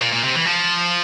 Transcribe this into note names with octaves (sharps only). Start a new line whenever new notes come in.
A#2
A#2
C3
E3
F3